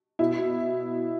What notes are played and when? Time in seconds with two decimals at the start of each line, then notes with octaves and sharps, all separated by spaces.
0.19 B2 E4